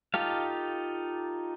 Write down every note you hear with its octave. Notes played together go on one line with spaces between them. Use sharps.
D#4 F4 G4 A4 F5